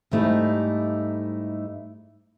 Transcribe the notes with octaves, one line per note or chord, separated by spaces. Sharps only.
G#2 G3 A3 D#4 E4